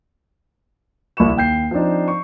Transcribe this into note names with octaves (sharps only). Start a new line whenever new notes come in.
D#1 C2 E4 B5 C#6 E7
D#2 G5 G6 C7
F3 C4 D4 D#4
C#6